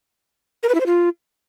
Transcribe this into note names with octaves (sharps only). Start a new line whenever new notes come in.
A#4
B4
E4
C5
F4